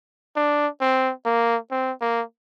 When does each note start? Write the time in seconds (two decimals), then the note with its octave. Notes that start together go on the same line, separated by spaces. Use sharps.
0.36 D4
0.81 C4
1.26 A#3
1.71 C4
2.01 A#3